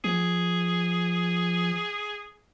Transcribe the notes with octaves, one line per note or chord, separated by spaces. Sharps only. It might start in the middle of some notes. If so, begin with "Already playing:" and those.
F3 G#4